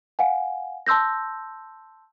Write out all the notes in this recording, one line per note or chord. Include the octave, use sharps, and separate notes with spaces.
F5 F#5 G#5
A5 C6 E6 G6 A#6